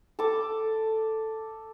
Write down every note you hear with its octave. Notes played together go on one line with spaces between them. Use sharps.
A4 D6